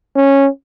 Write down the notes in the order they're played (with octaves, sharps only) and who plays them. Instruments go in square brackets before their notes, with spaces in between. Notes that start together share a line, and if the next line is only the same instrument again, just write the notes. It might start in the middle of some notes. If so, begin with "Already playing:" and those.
[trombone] C#4